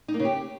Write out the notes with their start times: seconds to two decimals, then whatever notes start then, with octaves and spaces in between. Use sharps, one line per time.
0.08 D#4
0.14 A#3
0.20 C#3
0.25 G4